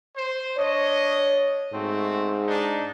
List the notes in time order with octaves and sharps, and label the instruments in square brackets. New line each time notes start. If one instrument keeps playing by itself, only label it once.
[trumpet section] C5
[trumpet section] D4 D#5 [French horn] C#5
[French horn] G#2 [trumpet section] A3 C4 F#4
[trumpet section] D4 D#4